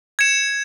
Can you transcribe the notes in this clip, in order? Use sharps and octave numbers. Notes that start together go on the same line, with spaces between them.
G#6 C#7 E7